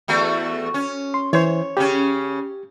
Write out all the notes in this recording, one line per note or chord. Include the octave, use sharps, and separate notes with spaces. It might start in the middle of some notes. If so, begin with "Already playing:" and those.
E2 A3 F#4
C#4
C6
E3 C5 C#5
C#3 C#4 G4